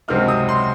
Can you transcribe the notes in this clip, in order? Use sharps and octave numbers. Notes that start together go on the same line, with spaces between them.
C#2 C3 F#3 C4 D#4 F6
D#6
C6